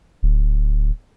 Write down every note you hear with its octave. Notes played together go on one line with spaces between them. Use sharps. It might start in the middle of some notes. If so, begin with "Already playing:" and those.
D1